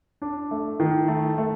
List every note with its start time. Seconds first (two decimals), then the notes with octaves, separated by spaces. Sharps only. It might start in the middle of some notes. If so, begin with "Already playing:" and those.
0.22 D4
0.51 A3
0.80 D#3
1.08 A3
1.38 A3